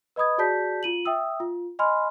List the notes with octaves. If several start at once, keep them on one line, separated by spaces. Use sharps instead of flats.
B4 D#5 B5 D#6 G#6
F#4 G#4 D5 A5 G6 B6
F4 D#7 F#7
E5 G5 D#6 E6
F4
D#5 G#5 B5 C6 F6